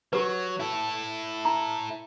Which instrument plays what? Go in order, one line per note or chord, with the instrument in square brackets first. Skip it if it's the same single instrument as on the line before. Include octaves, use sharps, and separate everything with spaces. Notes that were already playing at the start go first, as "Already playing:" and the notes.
[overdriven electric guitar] F#3 [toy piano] G4 B4
[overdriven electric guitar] E4 A4
[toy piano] A#5